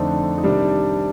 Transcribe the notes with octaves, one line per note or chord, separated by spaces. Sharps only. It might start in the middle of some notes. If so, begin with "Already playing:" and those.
Already playing: F2 D3 A3 C4 D4 D#4
D#4
C3 D#3 G3 D4